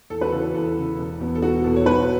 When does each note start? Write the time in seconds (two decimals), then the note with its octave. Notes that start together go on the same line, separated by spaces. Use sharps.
0.10 E2 A4
0.21 F#4 B4
0.32 C#3 E3 A4
0.43 A4
0.54 E2 A4
0.76 C#3 E3
0.98 E1
1.20 E2 B2 B3
1.35 A4
1.42 E1 F#4
1.64 E2 B2 B3 A4
1.76 C#5
1.86 B1 F#4 B4